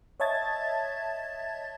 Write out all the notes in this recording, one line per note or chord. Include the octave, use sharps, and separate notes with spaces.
C#5 D#5 E5 A5 G#6 A6